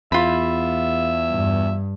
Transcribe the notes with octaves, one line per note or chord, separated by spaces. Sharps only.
E2 F4 E5 B5
G2